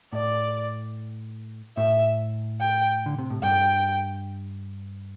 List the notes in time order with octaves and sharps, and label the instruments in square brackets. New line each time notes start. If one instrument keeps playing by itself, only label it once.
[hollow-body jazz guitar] A2 [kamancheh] D5
[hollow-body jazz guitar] A2 [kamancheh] E5
[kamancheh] G5
[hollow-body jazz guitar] D3
C3
A2
[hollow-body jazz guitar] G2 [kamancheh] G5